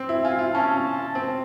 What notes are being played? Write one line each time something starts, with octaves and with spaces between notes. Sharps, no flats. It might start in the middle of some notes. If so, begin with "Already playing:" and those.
Already playing: C4
E4
F4 G#5
F4
C#4 A5
C4